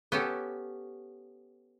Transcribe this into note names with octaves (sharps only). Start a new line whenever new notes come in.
B3 C#4 G4 A4